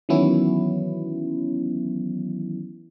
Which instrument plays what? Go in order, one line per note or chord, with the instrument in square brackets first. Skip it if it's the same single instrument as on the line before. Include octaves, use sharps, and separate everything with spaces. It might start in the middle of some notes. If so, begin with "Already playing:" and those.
[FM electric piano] D#3 E3 F#3 B3 C#4 E4